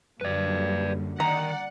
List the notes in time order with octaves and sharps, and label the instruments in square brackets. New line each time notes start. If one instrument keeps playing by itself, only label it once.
[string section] F#2 [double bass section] D3 G3 A#3 [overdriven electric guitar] B4 D5
[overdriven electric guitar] D#3 [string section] D5 F#5 [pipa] A#5